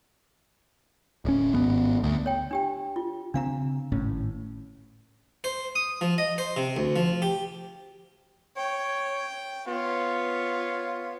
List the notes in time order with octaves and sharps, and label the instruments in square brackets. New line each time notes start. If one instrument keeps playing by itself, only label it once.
[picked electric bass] D1 C#4
G#1 B3
D2
[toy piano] C#5 G5
D4 G4 G5
F4
[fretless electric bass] C#3 C4 [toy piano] D4 F5 A#5
[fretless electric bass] G#1 A2 C#4
[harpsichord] C5
D#6
F3
D#5
C5
C3
D2
F3
G4
[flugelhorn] C#5 [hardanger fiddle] G5
[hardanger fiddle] B3 C#5 [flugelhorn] F4